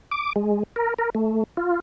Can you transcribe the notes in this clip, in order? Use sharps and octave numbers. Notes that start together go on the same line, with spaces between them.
D6
G#3
A#4
A#4
A3
F4